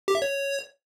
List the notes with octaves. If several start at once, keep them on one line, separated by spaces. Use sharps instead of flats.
G4
E5
C#5